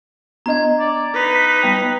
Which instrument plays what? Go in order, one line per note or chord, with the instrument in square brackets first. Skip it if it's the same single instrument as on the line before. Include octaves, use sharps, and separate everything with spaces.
[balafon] B3 D4 D#5 [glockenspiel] A#5 G#6
[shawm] D5
[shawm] D#4 [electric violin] B4 B6
[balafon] G3 B3 G5